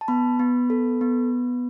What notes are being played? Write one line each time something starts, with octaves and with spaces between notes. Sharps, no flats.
A5
B3 B5
B3
A4
B3